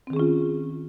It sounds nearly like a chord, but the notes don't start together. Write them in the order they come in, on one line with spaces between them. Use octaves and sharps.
C4 D#3 G#4 C#4 F4